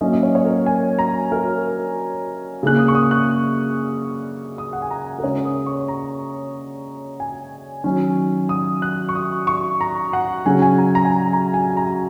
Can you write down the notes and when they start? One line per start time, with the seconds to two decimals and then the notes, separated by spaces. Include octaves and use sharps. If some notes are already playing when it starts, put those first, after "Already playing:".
0.01 F#3 A#3 C#4 D#5
0.12 D#5
0.23 C#5
0.35 C#5
0.45 A#4
0.66 G#5
0.99 A#5
1.32 A#4
2.63 C#3 A#3 C#4 F#6
2.79 D#6
2.88 C#6
2.95 D#6
3.11 F#6
4.58 D#6
4.73 F#5
4.82 G#5
4.91 A#5
5.19 A#4
5.24 C#3 G#3 C#4 C#5
5.45 D#6
5.66 C#6
5.88 A#5
7.20 G#5
7.84 D#3 F#3 C#4
8.49 D#6
8.82 F#6
9.09 C#6
9.15 D#6
9.47 C#6
9.81 A#5
10.13 F#5
10.46 C#3 F#3 C#4 G#5
10.62 G#5
10.78 A#5
10.95 A#5
11.05 G#5
11.11 A#5
11.33 A#5
11.54 G#5
11.70 G#5
11.77 A#5